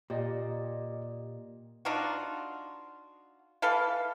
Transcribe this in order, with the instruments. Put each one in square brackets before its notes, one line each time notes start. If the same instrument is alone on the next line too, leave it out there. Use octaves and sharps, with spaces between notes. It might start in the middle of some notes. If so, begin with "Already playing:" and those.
[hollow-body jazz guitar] A#2 [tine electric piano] G4 D5 D#5
[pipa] D4 D#4 F4 F#4
E3 A4 B4 F5